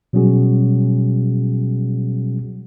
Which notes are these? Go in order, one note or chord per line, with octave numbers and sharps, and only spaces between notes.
B2 F#3 G3 C#4 F#4 G#4